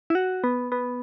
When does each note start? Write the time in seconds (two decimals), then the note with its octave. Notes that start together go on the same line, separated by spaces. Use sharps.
0.10 E4
0.15 F#4
0.44 B3
0.72 B3